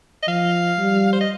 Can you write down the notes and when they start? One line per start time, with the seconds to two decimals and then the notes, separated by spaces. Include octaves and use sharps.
0.22 D#5
0.28 F3 F5
0.79 G3
1.13 C5
1.21 D#5